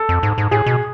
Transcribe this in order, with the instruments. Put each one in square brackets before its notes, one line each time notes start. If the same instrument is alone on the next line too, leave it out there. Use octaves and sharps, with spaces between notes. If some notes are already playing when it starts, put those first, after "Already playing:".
Already playing: [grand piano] A4
[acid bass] F2
G#2
G#2
[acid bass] A2 [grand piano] G#4
[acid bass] B2